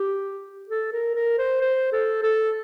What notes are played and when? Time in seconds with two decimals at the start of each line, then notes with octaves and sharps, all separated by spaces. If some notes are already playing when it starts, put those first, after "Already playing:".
Already playing: G4
0.69 A4
0.92 A#4
1.15 A#4
1.38 C5
1.61 C5
1.92 A4
2.23 A4